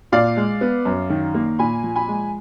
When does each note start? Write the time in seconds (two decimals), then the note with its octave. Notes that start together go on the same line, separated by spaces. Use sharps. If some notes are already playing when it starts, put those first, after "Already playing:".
0.12 A#2 D5 F5
0.37 G#3
0.61 B3
0.85 F#2
1.10 D#3
1.34 A#3
1.59 A#2 G#5 B5
1.83 F3
1.96 G#5 B5
2.08 G#3